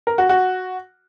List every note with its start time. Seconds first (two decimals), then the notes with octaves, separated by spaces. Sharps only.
0.07 A#4
0.18 F#4
0.29 F#4